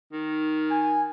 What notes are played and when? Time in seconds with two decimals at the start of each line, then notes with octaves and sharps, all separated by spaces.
0.12 D#3
0.70 G#5